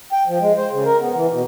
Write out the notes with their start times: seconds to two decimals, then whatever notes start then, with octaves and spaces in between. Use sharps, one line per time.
0.12 G5
0.27 F3
0.40 G#3
0.57 C5
0.72 C#3
0.85 A#4
1.00 B3
1.14 E3
1.31 B2